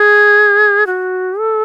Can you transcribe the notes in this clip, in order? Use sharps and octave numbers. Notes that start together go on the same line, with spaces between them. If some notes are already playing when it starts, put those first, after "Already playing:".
Already playing: G#4
F#4
A4